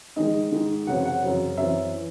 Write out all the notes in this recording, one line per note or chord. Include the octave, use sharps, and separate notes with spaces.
G#2 D#3 G#3 D#5
G#2 D#3 G#3
F#2 C#3 F#3 C4 F#5
F#5
F#2 C#3 F#3 C4
F#2 E3 C4 E5
E3